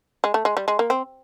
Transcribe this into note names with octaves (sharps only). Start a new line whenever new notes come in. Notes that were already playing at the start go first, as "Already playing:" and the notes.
G#3
A3
G#3
G3
G#3
A#3
C4